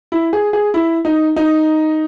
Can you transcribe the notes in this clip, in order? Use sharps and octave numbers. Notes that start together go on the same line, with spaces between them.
E4
G#4
G#4
E4
D#4
D#4